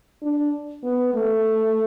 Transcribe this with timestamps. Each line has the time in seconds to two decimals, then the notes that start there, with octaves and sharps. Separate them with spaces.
0.22 D4
0.83 B3
1.14 A3